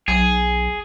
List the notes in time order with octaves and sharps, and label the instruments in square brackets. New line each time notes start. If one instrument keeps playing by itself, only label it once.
[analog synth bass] B1 [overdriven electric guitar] G#4